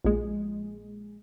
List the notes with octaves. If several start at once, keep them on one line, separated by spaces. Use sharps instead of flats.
A#1 G#3